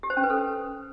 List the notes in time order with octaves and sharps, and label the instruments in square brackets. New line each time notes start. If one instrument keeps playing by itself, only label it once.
[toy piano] G4
C5
C#4
B4
A4